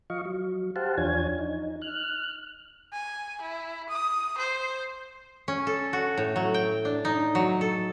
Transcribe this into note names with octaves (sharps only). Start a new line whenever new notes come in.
F3 D#5 F5 C#6
F#3
G4 C5 F5 F#5 A5
E2 F3 D4 C#5 G#5 G#6
D#4
F6 F#6
G#5
E4
D#6
C5
C#4
A4
F#4
A2
F#3
G5
D4
D#4
F#3
A4